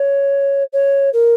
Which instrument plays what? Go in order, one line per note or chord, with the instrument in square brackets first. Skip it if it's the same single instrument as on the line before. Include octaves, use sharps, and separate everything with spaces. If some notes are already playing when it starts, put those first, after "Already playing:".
Already playing: [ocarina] C#5
C#5
A#4